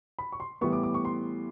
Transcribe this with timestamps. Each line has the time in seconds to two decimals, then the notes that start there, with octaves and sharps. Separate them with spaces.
0.19 B5
0.32 C#6
0.40 C6
0.61 A2 E3 G3 B3 C#6
0.72 D6
0.83 D6
0.94 C#6
1.05 C6